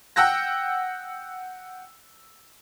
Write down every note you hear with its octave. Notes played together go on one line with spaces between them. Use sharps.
F#5 G5 E6 F#6 A#6